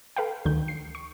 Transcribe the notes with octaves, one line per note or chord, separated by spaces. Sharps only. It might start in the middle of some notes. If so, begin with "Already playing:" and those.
A4 B4 F5 G5
D2 D#3 G6
C7
C#6